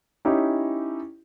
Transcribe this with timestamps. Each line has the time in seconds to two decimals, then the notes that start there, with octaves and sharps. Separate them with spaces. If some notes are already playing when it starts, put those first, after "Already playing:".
0.25 C#4 D#4 E4 G4